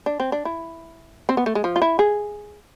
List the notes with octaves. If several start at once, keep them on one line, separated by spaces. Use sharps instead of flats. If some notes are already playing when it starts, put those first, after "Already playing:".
D4
C4
D4
E4
C4
B3
A3
G#3
F3
F4
E4
G#4